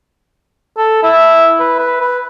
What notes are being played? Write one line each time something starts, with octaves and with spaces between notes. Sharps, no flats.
A4
E4
B4
B4
B4